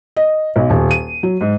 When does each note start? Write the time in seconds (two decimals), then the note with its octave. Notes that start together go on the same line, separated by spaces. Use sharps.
0.17 D#5
0.56 B1
0.70 D#1
0.91 D#7
1.23 F#3
1.41 G#2